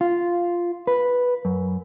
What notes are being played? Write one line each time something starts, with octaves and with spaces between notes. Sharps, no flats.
F4
B4
F#2